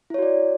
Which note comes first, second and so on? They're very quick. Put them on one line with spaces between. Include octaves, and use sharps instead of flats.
E4 C#5 F#4 D5